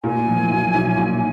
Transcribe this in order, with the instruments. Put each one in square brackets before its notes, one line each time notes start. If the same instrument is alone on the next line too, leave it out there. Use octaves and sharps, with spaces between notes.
[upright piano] A#2 [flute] G#5
[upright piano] F3
B1
B1
A#2